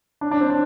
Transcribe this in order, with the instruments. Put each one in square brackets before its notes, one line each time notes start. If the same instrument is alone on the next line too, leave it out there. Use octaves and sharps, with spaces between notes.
[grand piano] D4
D4
C4
D4